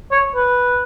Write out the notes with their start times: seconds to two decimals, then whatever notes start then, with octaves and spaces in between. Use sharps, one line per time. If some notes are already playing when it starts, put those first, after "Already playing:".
0.12 C#5
0.35 B4